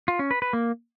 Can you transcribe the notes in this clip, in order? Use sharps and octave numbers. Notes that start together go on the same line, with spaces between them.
F4
C#4
B4
B4
A#3